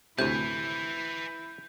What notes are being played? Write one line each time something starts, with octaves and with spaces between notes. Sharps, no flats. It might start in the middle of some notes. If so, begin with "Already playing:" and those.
D2 A2 C3 E4 B4 G#5 G6